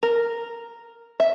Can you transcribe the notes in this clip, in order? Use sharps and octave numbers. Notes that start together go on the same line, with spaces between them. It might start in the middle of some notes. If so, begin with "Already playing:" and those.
A#4
E5